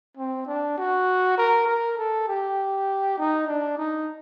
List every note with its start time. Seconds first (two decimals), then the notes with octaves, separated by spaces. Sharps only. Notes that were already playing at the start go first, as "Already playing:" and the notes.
0.17 C4
0.47 D4
0.78 F#4
1.38 A#4
1.67 A#4
1.98 A4
2.28 G4
3.18 D#4
3.47 D4
3.78 D#4